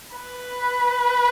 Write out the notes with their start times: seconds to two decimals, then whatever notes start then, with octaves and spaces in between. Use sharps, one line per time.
0.16 B4